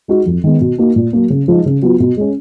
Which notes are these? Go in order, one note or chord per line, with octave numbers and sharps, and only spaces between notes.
G#3 D#4 F#4
F2
D#3 G#3 B3
B2
A#3 D#4 F#4
A#2
F#3 A#3
C#3
F3 G#3 D#4
C#3
F#3 B3 F4
B2
G#3 C#4